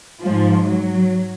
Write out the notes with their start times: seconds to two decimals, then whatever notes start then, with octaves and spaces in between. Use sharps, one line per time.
0.21 G#2 F3
0.68 F#3